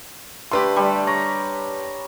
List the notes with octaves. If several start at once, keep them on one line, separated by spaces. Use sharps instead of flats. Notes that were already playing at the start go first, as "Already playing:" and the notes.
D3 A3 G4 A4 B4 C6
G3
C#5 A#5 C#6